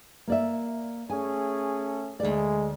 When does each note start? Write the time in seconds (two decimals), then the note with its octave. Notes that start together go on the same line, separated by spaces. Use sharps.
0.28 A#3 D5 E5
1.10 A3 C#4 G#4 G#5
2.20 D2 G#3 D5